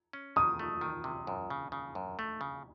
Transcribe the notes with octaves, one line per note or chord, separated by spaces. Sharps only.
C#4
D#3 D#6
A3
D#3
C3
F#2
C#3
C#3
F#2
A3
C#3